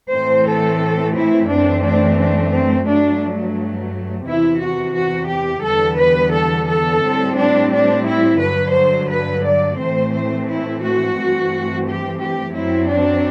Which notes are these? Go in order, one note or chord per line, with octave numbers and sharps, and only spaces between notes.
A2 E3 A3 C4 C5
A4
E4
F#2 E3 A3 C4 D4
D4
D4
C4
G2 F#3 A3 D4
E2 C3 E3 E4
F#4
F#4
G4
E2 D3 G3 B3 A4
B4
A4
A4
A2 G3 C4
D4
D4
E4
G2 D3 F#3 B4
C5
B4
D5
A2 E3 A3 C4 C5
C5
E4
F#4
G2 E3 A3 C4
G4
G4
F#2 F#3 C4 E4
D4